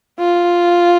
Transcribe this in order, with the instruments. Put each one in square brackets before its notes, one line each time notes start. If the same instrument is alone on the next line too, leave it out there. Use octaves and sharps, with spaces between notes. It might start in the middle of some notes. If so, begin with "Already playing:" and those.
[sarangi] F4